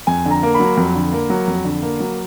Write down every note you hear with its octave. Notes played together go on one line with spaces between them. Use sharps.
F2 G#5
D3
A#5
A#3
B5
F#3
F2
D3
A#3
F#3
F2
D3
A#3
F#3